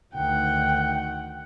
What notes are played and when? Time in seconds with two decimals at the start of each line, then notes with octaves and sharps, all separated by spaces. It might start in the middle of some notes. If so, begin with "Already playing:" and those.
0.14 D2 D#3 F#5 G5